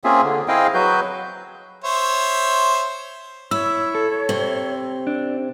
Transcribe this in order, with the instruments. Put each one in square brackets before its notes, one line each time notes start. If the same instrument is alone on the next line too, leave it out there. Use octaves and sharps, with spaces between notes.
[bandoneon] A#3 C4 C#4 F4 G#4 E5
D3
C4 E4 G#4 D#5 F5 G5
F#3 F#4 B4 G6
[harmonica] C5 C#5 E5
[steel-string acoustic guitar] E4 [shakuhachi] C#5 [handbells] E6
[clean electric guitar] A4
[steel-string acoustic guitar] C3 C4
[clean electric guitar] D4